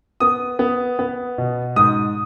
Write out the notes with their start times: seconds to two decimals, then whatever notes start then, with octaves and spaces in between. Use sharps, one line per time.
0.20 B3 D#6
0.59 B3
0.99 B3
1.38 B2
1.76 G#2 D#6